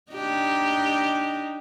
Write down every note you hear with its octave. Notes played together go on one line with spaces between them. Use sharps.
D4 D#4 G4